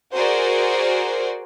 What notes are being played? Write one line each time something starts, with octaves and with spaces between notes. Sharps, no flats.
F#4 G#4 A#4 C5 D5